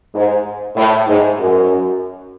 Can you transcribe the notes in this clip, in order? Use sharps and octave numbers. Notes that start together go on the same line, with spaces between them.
G#2
A2
G#2
F#2